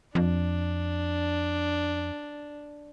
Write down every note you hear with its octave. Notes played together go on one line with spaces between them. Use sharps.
F2 D4